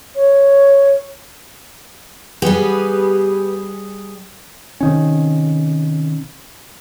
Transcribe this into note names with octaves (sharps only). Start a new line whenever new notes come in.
C#5
G3 B3 G4 G#4
C3 D#3 C#4